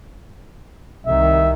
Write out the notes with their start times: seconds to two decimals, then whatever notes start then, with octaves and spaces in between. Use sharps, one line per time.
1.07 C2 D#3 E5